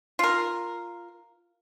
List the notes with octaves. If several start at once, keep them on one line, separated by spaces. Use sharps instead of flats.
F4 A#4